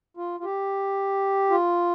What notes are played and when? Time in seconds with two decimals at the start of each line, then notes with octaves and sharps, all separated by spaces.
0.17 F4
0.40 F4
0.44 G4
1.50 F4